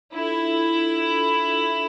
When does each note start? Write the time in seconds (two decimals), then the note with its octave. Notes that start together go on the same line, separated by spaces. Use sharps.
0.15 D4 E4 F4 A4 E5
0.96 D4 F4 A4 E5